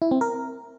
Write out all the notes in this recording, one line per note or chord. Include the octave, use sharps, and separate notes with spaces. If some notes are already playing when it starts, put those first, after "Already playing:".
E4
C4
A#4